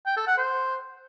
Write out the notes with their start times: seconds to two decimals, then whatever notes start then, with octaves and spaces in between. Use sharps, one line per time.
0.07 G5
0.17 A4
0.27 F#5
0.37 C5